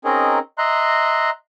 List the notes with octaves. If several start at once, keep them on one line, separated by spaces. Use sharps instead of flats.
C4 C#4 D#4 G#4 A#4 D#5
D#5 E5 A#5 C6 F#6